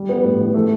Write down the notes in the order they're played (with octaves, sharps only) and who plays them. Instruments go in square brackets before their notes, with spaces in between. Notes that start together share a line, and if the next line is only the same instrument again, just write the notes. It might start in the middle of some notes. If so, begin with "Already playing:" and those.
Already playing: [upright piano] G3
B3
A2
E3
A3